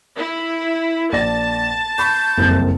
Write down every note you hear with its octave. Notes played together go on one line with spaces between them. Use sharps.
E4
A#1 D5 A5 A#6
B5 C#6 G6
F#1 C2 F2